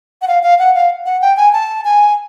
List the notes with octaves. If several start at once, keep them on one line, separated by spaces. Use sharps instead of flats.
F#5
F5
F5
F#5
F5
F#5
G5
G#5
A5
G#5